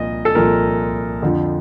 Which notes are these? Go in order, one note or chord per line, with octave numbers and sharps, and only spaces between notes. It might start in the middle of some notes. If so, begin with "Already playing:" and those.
Already playing: C2 A#2 F3 D#5
A4
C2 A#2 F3 A#4
F2 D3 F3